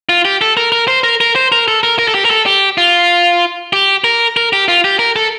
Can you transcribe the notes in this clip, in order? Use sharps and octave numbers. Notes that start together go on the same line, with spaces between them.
F4
G4
A4
A#4
A#4
C5
A#4
A#4
C5
A#4
A4
A#4
A#4
A4
G4
A#4
A4
G4
F4
G4
A#4
A#4
G4
F4
G4
A#4
A4